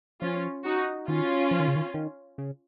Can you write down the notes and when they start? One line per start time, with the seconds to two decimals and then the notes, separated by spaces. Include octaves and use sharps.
0.21 F3 C#4 F4
0.65 D#4 F#4
1.08 D#3 C#4 F4
1.51 F3
1.60 D#3
1.68 C#3
1.76 D#3
1.94 D#3
2.38 C#3